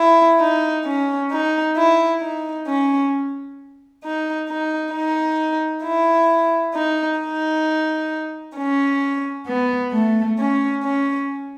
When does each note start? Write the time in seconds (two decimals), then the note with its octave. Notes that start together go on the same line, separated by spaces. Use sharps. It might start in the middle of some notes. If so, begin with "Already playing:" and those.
Already playing: E4
0.39 D#4
0.85 C#4
1.31 D#4
1.76 E4
2.21 D#4
2.66 C#4
4.03 D#4
4.48 D#4
4.93 D#4
5.84 E4
6.75 D#4
7.20 D#4
8.57 C#4
9.47 B3
9.93 A3
10.38 C#4
10.83 C#4